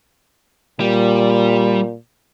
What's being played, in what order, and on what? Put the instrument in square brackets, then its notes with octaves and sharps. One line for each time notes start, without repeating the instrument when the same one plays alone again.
[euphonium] A#2 [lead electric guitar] G3